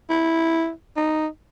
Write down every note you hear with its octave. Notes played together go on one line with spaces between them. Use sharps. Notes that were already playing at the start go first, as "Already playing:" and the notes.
E4
D#4